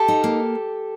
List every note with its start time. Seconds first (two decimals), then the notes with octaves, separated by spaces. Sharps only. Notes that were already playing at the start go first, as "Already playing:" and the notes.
Already playing: G4 A4
0.08 D#4
0.24 A#3